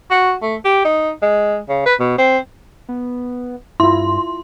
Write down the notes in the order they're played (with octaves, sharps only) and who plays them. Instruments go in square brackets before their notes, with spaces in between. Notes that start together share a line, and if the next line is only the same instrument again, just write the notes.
[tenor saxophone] F#4
A3
G4
D#4
G#3
C#3
B4
B2
C4
[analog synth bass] B3
[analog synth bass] G2 [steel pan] E4 F4 [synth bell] C6